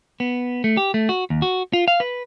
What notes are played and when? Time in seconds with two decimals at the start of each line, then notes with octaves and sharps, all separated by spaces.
0.20 B3
0.64 A3
0.77 G4
0.94 A3
1.09 F#4
1.30 D#2
1.42 F#4
1.73 F4
1.88 F5
2.00 B4